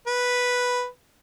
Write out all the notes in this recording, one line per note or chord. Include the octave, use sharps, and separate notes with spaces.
B4